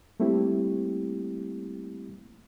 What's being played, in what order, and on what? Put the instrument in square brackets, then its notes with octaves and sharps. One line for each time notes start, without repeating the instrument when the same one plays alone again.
[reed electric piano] G3 A3 A#3 C4 E4 G4